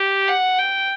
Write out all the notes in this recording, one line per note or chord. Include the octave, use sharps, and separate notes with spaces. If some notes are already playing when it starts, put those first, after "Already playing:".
Already playing: G4
F#5
G5